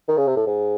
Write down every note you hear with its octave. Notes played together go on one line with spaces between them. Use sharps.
D#3
C#3
C3
A2
G#2